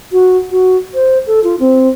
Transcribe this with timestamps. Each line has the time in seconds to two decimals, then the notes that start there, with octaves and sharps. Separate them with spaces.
0.12 F#4
0.51 F#4
0.94 C5
1.27 A4
1.44 F4
1.60 C4